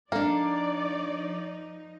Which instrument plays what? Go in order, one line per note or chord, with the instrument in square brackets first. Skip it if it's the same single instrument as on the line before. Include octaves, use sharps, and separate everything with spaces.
[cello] F3 D#4 [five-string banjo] A#3 [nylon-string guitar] D4 A4 [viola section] D5